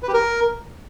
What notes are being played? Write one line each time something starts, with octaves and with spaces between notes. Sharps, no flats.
B4
G4
A#4